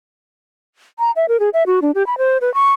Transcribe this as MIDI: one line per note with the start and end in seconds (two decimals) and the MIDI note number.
0.99 1.11 82
1.16 1.26 76
1.28 1.39 70
1.40 1.49 68
1.54 1.63 76
1.67 1.80 66
1.82 1.91 62
1.95 2.06 67
2.07 2.18 83
2.18 2.38 72
2.41 2.53 71
2.54 2.72 85